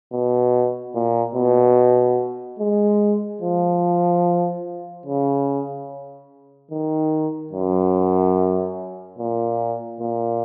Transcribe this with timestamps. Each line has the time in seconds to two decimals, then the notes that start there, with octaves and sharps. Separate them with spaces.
0.12 B2
0.94 A#2
1.35 B2
2.59 G#3
3.41 F3
5.06 C#3
6.71 D#3
7.53 F#2
9.18 A#2
10.00 A#2